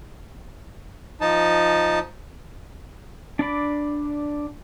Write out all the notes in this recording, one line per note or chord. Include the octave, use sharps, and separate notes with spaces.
F3 D#4 A5
D4 D5 B5